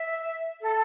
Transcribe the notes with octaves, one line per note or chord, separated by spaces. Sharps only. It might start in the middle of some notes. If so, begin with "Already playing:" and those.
Already playing: E5
A4